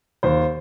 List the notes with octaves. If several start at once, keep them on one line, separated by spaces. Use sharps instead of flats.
D#2 C5